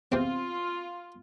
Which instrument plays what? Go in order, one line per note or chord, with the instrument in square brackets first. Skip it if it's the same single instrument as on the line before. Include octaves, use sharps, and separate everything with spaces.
[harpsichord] E2 C3 [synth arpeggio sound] C4 [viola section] F4